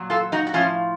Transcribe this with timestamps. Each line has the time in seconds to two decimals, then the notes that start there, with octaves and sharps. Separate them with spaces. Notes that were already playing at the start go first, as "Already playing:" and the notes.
Already playing: A#2 F#3
0.10 F4 A4
0.32 D#4 F#4
0.47 F#4
0.54 A2 F3 C#4 F4